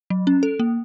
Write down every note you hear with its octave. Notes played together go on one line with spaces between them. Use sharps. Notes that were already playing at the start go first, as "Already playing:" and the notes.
F#3
C#4
A4
A#3